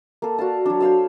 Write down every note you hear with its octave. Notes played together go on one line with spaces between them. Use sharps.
A#3 A4
F#4 D5 F5 A5
F#3 D4
C5 C#5 F5 E6